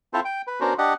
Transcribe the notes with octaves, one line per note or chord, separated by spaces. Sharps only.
C4 E4 F4 A4 C5
G5
B4
B3 C#4 D4 F#4 A#4 C5
D4 G4 D#5 F#5